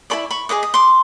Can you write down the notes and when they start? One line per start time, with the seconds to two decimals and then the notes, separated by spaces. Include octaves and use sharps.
0.10 E4 A4 D5 B5 C#6
0.31 B5 C#6
0.49 G#4 C5 D#5 D6
0.63 D#6
0.74 C6 D6